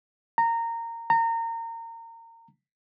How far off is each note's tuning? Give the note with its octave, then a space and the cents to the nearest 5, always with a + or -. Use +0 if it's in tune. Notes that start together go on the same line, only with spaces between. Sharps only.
A#5 -20
A#5 -30